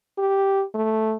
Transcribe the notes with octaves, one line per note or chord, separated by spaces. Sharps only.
G4
A3